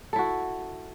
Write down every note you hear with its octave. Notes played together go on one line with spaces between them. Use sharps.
E4 F#4 A4